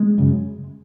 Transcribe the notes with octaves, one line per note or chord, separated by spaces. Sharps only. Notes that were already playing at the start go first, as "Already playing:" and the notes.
Already playing: G#3
F#2 C#3